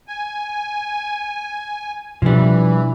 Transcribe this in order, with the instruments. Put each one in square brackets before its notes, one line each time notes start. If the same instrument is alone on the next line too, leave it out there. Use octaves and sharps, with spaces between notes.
[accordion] G#5
[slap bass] B2 D4 [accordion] E3 [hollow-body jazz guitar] F3 G3